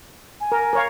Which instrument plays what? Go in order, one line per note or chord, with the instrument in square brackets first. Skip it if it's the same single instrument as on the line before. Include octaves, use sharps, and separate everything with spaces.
[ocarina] G#5
[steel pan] A#4
A#4 C#5 F5